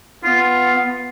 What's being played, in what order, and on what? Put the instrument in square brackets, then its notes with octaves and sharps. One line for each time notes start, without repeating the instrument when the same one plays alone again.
[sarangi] B3 [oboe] F4